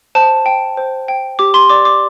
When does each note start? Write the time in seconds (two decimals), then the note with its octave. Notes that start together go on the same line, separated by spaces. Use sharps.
0.15 C5 A5
0.46 G5
0.77 C5
1.08 G5
1.39 G4 D6
1.54 C6
1.69 D5 D6
1.85 D6